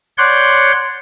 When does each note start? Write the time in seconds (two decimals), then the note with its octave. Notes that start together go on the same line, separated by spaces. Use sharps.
0.18 C#5 D5 F#5 C6 F#6 G6